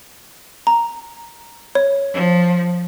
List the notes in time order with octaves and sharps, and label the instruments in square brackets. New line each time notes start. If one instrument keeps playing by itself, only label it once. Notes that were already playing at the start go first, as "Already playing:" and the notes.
[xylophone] A#5
C#5
[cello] F3